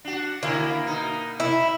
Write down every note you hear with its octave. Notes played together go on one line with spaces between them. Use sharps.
D4 F#4
D3 A#3 E4
B2 D#4
E4